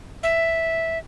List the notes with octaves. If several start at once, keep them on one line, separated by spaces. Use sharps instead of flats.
E5